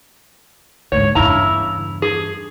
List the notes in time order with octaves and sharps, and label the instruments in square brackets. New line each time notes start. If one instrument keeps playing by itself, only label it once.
[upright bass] D2 G#2 [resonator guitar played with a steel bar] C#5
[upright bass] E2 G2 [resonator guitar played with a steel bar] C#3 E4 A#5
[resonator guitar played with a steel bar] G#4